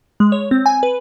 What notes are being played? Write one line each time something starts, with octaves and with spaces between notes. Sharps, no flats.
G#3
C#5
C4
G#5
B4